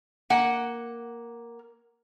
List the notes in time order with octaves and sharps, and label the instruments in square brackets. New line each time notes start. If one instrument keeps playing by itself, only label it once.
[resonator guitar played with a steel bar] A#3 F#5